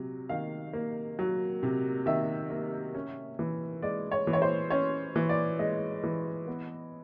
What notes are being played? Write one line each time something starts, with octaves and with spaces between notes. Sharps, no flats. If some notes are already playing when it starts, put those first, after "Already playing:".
Already playing: C3 F#3
D#3 F5
A#3
F#3
C3
D#3 E5
A#3
C#4
E3
G#3 D5
C#5
E3
C#5
C5
C#4 C#5
E3
D5
G#3 D#5
E3
B3